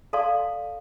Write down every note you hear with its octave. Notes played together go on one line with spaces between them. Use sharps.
A4 D5 F5 A5 C6